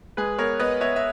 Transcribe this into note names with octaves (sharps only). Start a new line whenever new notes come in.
G#3 G#4 B4
B3 A#4 C#5
B3 B4 D#5
B3 C#5 E5
E5